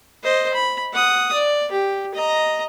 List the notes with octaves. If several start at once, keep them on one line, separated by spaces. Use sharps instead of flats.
C5 D#5
B5
F#5 D#6
D5
G4
D#5 A#5